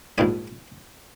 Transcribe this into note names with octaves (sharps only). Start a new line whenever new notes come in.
A#1 G#2 G3 G#5